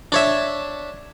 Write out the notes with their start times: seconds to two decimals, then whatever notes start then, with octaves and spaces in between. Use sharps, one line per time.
0.12 D4 C#5 E5